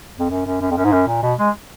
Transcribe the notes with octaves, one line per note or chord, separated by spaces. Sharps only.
F2
F#2
F#2
F#2
F2
F#2
G#2
F#2
A#2
B2
G#3